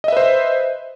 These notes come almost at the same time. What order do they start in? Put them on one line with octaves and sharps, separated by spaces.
D#5 E5 B4 C5